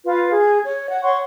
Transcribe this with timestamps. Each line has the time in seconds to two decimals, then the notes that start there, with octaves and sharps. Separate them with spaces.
0.05 F4 B4 F5
0.30 G#4
0.65 C#5
0.91 F#5
1.02 C#5 F#5 C6 C#6